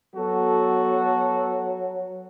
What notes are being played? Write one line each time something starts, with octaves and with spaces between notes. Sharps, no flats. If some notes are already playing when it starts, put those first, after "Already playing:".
F#3 B3 F#4 A4